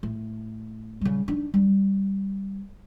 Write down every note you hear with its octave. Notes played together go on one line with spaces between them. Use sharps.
A2
C#3 G3
D4 D#4
G3